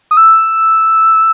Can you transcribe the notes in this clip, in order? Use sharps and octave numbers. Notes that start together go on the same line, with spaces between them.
D#6
E6